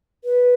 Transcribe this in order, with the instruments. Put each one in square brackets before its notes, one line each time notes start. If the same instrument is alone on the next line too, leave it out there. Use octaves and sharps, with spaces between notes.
[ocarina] B4